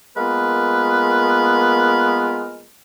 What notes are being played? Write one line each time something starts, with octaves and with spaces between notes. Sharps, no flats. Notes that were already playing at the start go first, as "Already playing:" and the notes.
G#3 A#3 B3 F4 A#4 B4